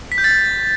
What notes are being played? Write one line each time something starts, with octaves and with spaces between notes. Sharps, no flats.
B6
G6
A6